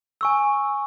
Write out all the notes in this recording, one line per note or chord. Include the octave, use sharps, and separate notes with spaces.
G#5 C#6 E6